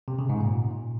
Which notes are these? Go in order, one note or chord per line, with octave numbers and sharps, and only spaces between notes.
C3
C#3
G#2
A#2